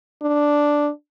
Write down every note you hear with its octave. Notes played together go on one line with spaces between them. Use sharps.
D4